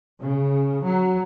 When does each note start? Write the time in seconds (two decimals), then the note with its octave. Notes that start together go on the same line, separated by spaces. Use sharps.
0.23 C#3
0.84 F#3